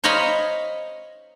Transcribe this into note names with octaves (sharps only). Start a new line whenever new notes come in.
C5 C#5 D#5 F5 A#5 B5